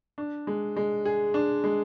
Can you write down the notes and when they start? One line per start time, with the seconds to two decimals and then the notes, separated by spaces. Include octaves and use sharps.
0.18 D4
0.47 G#3
0.76 G#3
1.05 G#4
1.34 D4
1.64 G#3